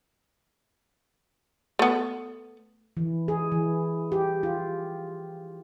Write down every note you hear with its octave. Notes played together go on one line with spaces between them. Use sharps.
A3 B3
E3
G#4
E3
G4
F4